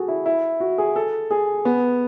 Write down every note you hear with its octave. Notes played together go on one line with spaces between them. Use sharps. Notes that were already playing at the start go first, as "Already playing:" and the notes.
Already playing: F#4 G#4 A4
E4
E4
F#4
G#4
A4
G#4
B3